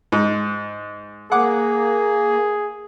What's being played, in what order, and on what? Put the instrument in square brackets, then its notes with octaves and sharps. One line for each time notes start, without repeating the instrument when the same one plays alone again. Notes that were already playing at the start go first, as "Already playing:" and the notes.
[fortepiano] G#2
[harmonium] A#3 [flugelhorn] G#4 [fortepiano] F#5 D6